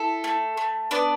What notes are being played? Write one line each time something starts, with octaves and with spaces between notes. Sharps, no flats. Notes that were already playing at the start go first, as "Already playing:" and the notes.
Already playing: E4 A4 E5
A3
A3
B3 D4 D5